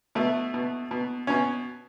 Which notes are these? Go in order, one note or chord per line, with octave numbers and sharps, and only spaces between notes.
B2 A3
B2
B2
B2 C#4